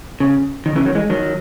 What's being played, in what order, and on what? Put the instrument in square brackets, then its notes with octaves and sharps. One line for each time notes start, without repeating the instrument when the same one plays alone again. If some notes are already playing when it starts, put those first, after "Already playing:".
[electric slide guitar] C#3
D#3
C#3 E3
D#3 F#3
E3 G#3
D#3 F#3